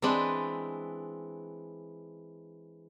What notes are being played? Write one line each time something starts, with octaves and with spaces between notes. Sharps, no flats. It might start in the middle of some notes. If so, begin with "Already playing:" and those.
E3 G#3 C4 D4 B4